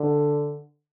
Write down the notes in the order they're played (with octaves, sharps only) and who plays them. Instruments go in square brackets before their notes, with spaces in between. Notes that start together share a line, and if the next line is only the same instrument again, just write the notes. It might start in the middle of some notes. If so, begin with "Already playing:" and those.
Already playing: [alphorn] D3